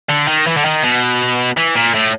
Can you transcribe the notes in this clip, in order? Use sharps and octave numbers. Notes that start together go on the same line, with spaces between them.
D3
D#3
E3
D3
D#3
B2
E3
A#2
A2